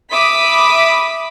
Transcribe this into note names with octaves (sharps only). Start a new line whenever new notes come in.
E5 B5 D6 D#6 B6